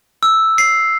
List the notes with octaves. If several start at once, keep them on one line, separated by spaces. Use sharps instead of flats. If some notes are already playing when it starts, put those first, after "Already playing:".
E6
C7